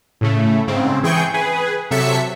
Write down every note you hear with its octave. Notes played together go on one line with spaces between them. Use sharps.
A2 C#3 A3
G#2 C#3 C4
E3 G#4 G5 C#6 G6
G#4 B4
C3 F#3 A4 E5 B6 C#7